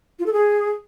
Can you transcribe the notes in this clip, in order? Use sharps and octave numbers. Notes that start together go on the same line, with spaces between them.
F4
A4
G#4